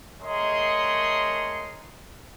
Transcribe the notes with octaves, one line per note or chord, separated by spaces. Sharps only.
A3 G#4 A#4 C#5 D#5 C6